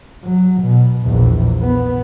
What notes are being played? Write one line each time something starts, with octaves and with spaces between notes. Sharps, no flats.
F#3
B2
A#1 E2
B3